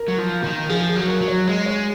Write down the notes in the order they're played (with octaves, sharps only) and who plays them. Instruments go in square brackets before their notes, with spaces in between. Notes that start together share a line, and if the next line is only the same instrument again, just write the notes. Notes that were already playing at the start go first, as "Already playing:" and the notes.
Already playing: [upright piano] A#4
[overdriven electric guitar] F#3
F3
D#3
[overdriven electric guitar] F3 [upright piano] G#4
[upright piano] G#4
[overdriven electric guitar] F#3
[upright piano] A#4
[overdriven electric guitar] F#3
[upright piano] C#5
[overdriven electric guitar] G#3
[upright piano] C#5